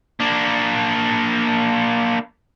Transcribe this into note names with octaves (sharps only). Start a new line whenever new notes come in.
A#3 D4